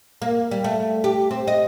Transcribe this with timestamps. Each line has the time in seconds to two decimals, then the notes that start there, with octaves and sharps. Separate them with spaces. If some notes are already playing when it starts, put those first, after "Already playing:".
0.22 A#3
0.51 G3
0.64 A3
1.04 G4
1.31 C4
1.47 D#5